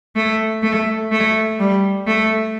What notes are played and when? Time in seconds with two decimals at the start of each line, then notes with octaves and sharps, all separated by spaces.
0.16 A3
0.63 A3
1.11 A3
1.59 G3
2.07 A3